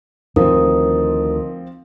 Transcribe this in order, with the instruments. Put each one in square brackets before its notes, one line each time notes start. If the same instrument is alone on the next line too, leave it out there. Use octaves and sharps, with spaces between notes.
[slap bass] D2 D#3 [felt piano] F3 C4 [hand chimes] A#4 D#6